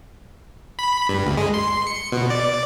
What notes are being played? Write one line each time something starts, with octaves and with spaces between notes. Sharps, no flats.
B5
G2
D2
G#3
C6
C#7
B2
D5